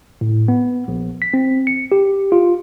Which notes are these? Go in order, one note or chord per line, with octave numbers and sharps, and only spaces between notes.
A2
B3
A#1
B6
C4
C#7
G4
F4